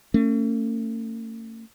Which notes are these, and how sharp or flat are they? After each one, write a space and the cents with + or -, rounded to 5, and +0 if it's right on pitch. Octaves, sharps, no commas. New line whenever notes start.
A3 +45 C#4 +0